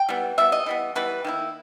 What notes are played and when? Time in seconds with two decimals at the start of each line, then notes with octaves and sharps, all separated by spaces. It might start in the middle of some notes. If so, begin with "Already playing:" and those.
Already playing: G5
0.09 E3 G3 B3
0.38 E3 G3 B3 E5
0.52 D#5
0.66 E3 G3 B3
0.95 E3 G3 B3 B4
1.24 D#3 A#3 E4